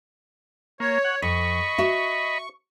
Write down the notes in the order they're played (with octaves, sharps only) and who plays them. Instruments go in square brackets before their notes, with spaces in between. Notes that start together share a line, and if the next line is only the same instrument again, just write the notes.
[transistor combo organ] A#3 [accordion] C#5
[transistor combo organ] F#5
[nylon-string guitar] F2 [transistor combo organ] D#5 B5 [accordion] C#6
[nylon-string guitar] F#4 E5